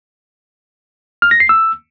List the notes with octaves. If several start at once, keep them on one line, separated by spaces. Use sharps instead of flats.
F6
A#6
C7
E6